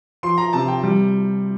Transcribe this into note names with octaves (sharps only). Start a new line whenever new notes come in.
F3 C6
A#5
C3 A5
G5
G3